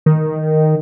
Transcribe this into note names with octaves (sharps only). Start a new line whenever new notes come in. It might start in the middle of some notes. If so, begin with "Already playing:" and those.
D#3